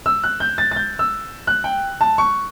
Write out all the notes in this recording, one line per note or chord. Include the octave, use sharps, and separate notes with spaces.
E6
F#6
G6
A6
A6
G6
E6
F#6
G5
A5
C#6